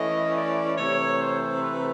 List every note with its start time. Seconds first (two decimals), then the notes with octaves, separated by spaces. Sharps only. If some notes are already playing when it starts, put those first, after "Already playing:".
Already playing: E3 A3 C#4 D#5
0.35 D5
0.78 C3 E3 A3 C#5
1.21 C5
1.63 B4